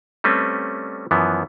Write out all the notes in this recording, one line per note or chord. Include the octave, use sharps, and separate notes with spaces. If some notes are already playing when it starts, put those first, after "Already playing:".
G3 A3 C4 C#4 B4
F#2 E3 F3 B3